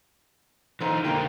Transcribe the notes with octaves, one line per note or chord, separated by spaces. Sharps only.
A#2 D3 E3 D#4 C5
D3 A#3 D#4 F4 G4